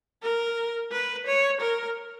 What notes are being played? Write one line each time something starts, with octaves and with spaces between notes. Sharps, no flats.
A#4
B4
C#5
A#4